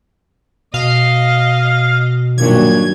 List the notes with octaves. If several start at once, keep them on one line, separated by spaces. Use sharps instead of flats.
B2 D#5 F5
G2 A#2 D#3 F#3 G#6